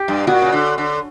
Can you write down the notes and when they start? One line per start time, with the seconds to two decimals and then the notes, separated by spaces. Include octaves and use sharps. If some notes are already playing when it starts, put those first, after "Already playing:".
Already playing: G4
0.08 G2
0.27 A#2 F#4
0.42 C#3
0.52 D3
0.78 D3